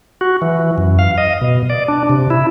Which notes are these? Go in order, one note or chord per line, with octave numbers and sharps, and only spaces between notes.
F#4
E3
F#2
F5
D#5
B2
D5
D4
C3
E4